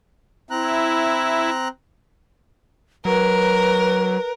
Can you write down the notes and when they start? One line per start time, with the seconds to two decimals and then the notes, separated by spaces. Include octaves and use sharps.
0.51 C4 E4 A#5 F#6
3.05 F#3 A#4 B4